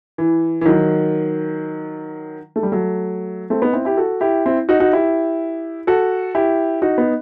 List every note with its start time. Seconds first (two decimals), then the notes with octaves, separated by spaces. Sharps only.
0.18 E3
0.61 E3
0.65 D#3 F#3
2.56 A3
2.63 G3
2.72 F#3 A3
3.50 A3 C4
3.62 B3 D#4
3.73 C4 E4
3.85 E4 G4
3.97 F#4 A4
4.21 E4 G4
4.46 C4 E4
4.69 D#4 F#4
4.80 D#4 F#4
4.93 E4 G4
5.87 F#4 A4
6.35 E4 G4
6.82 D#4 F#4
6.98 B3 D#4